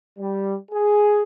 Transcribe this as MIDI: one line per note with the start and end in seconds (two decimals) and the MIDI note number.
0.18 0.56 55
0.72 1.22 68